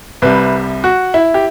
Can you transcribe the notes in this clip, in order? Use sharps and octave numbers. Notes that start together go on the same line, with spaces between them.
C2 C3 G3 B4
F#4
E4
G4